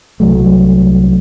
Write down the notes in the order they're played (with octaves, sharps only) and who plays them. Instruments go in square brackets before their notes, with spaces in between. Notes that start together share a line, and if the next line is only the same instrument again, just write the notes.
[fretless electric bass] C2 F#3 A3